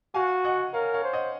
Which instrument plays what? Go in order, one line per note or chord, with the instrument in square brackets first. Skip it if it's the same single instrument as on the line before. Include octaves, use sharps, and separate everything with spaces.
[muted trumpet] F#4 [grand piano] F5 G#5
[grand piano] D#5 F#5
[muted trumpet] A#4 [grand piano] C#5 F5
[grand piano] C#5 F5
[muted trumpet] C5
[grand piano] D#5 F#5